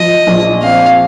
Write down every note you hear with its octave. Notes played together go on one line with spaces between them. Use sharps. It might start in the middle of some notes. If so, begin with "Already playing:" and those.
Already playing: F3 D#5
A#1
C4 F5